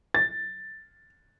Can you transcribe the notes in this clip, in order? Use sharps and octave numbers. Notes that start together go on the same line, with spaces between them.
A6